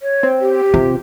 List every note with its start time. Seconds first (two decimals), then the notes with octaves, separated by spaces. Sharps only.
0.01 C#5
0.23 C4
0.41 G4
0.74 C3 F4